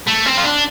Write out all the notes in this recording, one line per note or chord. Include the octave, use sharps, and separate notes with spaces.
A3
C4
F4
D4